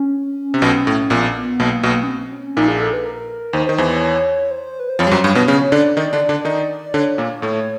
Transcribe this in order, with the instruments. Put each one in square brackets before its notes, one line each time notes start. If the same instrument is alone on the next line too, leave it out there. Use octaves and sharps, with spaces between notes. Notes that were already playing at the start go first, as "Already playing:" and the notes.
Already playing: [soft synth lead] C#4
[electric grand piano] C3
B1 B2
A2
[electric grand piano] A#1 A#2 [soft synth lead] B3
[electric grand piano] B1 B2 [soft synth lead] A#3
[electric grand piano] B1 B2
[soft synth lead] C#4
C4
C#4
[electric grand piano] A#1 A#2 [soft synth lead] D#4
[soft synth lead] G#4
A4
B4
A#4
[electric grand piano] D#2 D#3 [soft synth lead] C5
[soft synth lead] C5
[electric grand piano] D#3
[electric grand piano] E2 E3 [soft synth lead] C5
[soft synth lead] C#5
C5
B4
C5
[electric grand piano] F2 F3 [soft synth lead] C#5
[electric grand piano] G3
F#2 F#3
G2 G3
B2 B3
[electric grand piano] C#3 C#4 [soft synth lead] C#5
[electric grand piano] D3 D4 [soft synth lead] D5
[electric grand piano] D#3 D#4 [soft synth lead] D5
[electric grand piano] D3 D4
D3 D4
D#3 D#4
[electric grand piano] D3 D4 [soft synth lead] C#5
[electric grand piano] A#2 A#3
A2 A3